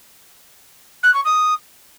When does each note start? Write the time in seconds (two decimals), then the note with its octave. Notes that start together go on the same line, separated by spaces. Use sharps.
1.03 F#6
1.14 C#6
1.25 D#6